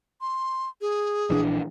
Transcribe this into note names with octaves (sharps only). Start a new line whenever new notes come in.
C6
G#4
A#1 E3 D4